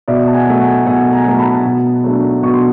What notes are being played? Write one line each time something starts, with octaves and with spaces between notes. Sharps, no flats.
B2 D5 E5
A5
F#5 G#5
F#3 A3
F#5 G#5
B2 F#5 G#5
G#5 A#5
F#3 A3
A5 B5
B2
F#3 A3 D4
B2 C#6
C6